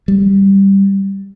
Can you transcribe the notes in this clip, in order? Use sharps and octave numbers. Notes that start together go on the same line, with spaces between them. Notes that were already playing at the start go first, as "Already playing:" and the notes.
G3